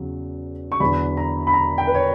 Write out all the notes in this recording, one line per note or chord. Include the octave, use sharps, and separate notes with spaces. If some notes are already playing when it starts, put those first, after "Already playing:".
Already playing: E2 C#3 F#3
C#6
E2 D3 F#3 B5
A#5
B5
A#5
G5
B4
C#5